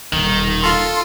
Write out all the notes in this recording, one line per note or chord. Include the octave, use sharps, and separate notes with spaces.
D#1 B2 D#3
F4 A4 C6